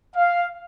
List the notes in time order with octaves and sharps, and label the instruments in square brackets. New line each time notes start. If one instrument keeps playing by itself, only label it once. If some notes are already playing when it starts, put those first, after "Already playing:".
[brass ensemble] F5